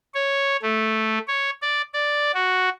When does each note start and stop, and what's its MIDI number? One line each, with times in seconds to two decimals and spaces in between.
0.15 0.57 73
0.62 1.19 57
1.28 1.50 73
1.62 1.82 74
1.94 2.32 74
2.34 2.69 66